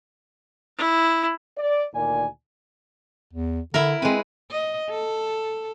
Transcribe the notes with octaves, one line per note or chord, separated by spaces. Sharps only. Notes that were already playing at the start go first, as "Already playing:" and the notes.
E4
D5
D2 A#2 D#3 D5 G#5
E2
D3 E4 A#4
G#3 C4 B4
D#5
A4